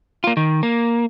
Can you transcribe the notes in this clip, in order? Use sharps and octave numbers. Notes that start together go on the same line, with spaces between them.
A#3 F4
D#3
A#3